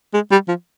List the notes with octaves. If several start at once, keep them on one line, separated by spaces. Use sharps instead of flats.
G#3
G3
F3